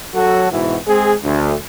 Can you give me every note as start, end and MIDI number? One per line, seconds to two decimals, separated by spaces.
0.15 0.50 54
0.15 0.50 66
0.15 0.50 69
0.52 0.77 44
0.52 0.77 47
0.52 0.77 52
0.52 0.77 59
0.52 0.77 64
0.52 0.77 66
0.87 1.14 56
0.87 1.14 60
0.87 1.14 68
1.23 1.54 38